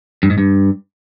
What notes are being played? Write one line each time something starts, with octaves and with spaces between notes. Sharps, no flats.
G2
G#2
G2